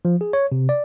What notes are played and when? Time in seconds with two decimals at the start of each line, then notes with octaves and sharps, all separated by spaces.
0.05 F3
0.21 G#4
0.33 C#5
0.52 C3
0.69 D5